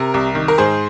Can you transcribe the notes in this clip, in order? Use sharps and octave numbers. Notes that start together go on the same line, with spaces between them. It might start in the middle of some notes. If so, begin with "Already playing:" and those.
Already playing: C3 A#4
C2
D#3
A#4
G#2 G#4 C5